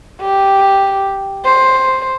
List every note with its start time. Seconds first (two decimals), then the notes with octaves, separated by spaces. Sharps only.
0.21 G4
1.45 C5